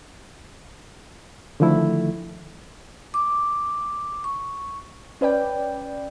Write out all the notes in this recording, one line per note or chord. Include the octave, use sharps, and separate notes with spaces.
D3 D#3 F3 A3 E4
D6
C#6
C#4 B4 D5 G5